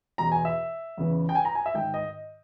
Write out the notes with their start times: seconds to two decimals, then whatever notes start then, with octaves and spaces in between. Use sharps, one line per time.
0.18 E2 B2 A#5
0.32 G#5
0.45 E5
0.97 E2 C#3 E3
1.29 G5
1.35 G#5
1.45 A#5
1.55 G#5
1.66 E5
1.74 G#2 D#3 G5
1.94 D#5